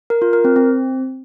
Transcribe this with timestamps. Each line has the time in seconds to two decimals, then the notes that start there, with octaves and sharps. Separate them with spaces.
0.10 A#4
0.22 F4
0.33 A#4
0.45 C4
0.56 C4